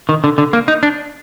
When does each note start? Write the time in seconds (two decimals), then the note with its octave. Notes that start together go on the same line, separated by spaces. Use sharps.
0.09 D#3
0.24 D3
0.38 D3
0.53 A#3
0.68 D#4
0.83 D4